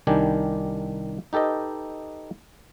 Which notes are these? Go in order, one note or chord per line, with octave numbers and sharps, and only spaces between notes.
C2 D#3 D4 G4 G#5
D#4 G4 A4 B4 D#5